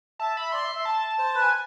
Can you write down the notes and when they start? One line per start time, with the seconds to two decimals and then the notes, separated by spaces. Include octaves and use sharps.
0.20 E5 A5
0.37 E5 B5
0.52 D5 C6
0.64 E5
0.75 E5
0.85 A5
1.19 C5
1.35 B4
1.42 G#5